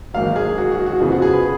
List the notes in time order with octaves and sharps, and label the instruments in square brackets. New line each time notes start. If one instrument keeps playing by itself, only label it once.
[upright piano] G#1 G#2 F#3 A#3 F5
G#4
F#4
F#4
F#4
F2 C#3 F3 B3 G#4
F#4
G#4
B4